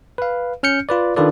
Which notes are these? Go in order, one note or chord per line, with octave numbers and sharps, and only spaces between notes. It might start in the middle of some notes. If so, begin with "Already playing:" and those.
B4 F5
C#4 F6 G6 C#7
F4 B4 D5
D#3 D4 F4 A4 B4 D5